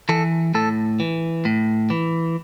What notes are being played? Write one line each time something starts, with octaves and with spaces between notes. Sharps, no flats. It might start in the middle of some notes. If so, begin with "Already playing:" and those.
E3 A4
A2 A4
E3
A2
E3